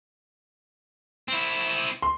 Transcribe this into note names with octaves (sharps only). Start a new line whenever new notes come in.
C4 E4
C6